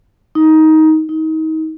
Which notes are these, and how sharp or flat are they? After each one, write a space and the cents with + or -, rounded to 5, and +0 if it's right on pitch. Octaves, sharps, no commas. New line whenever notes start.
D#4 +15
D#4 +30